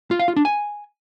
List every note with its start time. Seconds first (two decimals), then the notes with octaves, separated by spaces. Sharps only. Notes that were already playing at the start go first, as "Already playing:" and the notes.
0.11 F4
0.19 F5
0.28 F4
0.36 D4
0.45 G#5